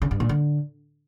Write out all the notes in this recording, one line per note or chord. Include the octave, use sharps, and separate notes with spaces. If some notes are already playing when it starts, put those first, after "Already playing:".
C#3
G2
A#2
D3